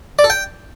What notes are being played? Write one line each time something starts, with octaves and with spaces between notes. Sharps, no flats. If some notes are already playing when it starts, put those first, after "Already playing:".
D5
A4
G5